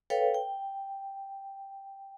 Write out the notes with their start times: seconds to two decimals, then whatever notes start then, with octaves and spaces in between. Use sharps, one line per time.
0.10 A4 B4 C#5 F5 G5
0.34 G5